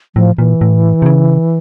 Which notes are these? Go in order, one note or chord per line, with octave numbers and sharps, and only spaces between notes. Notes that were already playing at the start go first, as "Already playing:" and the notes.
A2 F3
A#2 E3
A2
C3
C#3